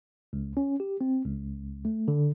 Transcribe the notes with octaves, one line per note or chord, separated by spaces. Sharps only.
C#2
C#4
G4
C4
C#2
A3
D3